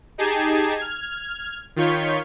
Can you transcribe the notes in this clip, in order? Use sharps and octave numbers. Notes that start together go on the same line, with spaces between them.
D#4 G4 G#4 A5 G#6 C7
F6 G#6
D#3 F4 C#5 C#6 G6 B6